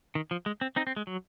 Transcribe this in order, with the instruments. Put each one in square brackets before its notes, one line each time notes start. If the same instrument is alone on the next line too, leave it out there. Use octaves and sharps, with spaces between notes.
[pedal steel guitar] D#3
F3
G#3
C4
C4 D#4
C4
G#3
F#3